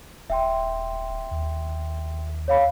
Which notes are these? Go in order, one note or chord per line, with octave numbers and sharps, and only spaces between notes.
D#1 E5 G5 C6
D#2
C#5 F5 B5